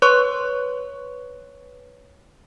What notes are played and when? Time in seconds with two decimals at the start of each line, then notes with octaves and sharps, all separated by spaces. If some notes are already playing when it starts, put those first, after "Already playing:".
0.02 B4 C#5 C6 C#6 F#6